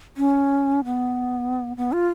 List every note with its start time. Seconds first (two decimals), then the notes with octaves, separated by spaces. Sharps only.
0.17 C#4
0.85 B3
1.77 B3
1.92 F4